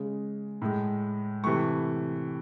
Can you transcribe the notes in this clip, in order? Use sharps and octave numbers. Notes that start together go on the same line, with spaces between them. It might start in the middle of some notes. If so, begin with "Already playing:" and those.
Already playing: C#3 G#3
A2 G#3
C3 E3 A3 C#6